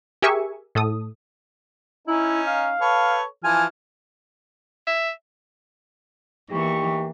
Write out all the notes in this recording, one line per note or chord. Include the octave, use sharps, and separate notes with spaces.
G4 G#4 A#4 E5 G#5 C#6
A2 A4 D#6
C#4 D#4 E4
F5
A4 B4 C#5
E3 F3 G#5 F6
E5
E2 E3 A#3 D#4 G4 C#6